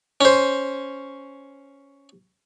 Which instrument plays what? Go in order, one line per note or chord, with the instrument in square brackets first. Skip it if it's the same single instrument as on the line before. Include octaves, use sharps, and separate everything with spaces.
[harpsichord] C#4 C5